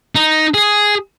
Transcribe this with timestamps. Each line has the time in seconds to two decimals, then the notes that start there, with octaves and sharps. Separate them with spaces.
0.15 D#4
0.54 G#4